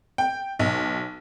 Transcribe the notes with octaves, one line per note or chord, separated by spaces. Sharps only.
G5
B1